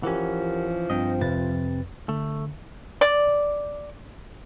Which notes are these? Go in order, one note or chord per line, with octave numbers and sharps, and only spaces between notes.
E3 F3 C#4 G4 A#4 F#5
G2 C4 D#5 G5
F2 C3 B4 A6
D3 A3
D5